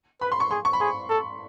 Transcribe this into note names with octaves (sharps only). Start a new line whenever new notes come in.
B4 B5
C6
C#6
G#4 C6
C#6
B5
G#4 C6
A4